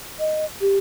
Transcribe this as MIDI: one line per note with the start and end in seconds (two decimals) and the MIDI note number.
0.19 0.45 75
0.61 0.78 67